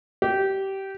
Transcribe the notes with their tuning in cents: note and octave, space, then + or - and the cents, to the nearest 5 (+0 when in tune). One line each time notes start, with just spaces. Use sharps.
G4 -20